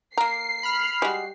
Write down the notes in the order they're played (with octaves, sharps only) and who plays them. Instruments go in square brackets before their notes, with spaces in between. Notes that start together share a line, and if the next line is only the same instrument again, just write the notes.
[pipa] A#3 A#4 [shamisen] A#5 [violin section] C7
[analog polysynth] B5 F6
[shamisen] G3 [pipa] G#3 F#4